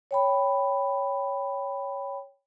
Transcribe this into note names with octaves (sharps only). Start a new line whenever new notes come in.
C#5 G5 B5